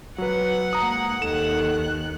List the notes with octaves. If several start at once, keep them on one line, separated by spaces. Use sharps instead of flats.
F#3 B4 F#5
G#2 A#3 A#5 D#6
D#2 D#3 A4 F#6 E7